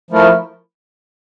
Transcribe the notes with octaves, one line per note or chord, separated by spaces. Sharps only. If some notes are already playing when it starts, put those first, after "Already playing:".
F3 A3 E4 A#4